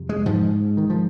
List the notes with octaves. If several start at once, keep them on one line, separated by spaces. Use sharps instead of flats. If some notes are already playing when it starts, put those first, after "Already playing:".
Already playing: F2 C3
G#3
G#2 F3
D#3
F3